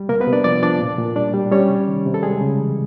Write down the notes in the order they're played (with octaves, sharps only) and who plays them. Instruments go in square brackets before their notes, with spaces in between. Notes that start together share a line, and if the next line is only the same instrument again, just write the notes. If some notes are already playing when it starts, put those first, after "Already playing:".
Already playing: [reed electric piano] G3
C3 A#3 A#4
B3 B4
C3
D4 D5
F3 D5
F3 D4 D5
A#2
A#2
G3 D4 D5
G3
G3 C#4 C#5
C3
D#3
C3
A4
G3 G#3 G#4
C#3
E3